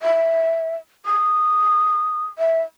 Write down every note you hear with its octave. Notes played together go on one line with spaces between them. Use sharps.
E5
D#6
E5